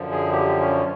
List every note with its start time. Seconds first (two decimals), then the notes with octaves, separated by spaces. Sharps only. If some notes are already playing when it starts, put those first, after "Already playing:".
Already playing: F#2 D3 F3
0.12 G#4
0.32 G4
0.60 C#4